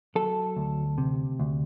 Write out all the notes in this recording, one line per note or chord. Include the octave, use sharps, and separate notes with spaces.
F#3 A4
D2
C3
D2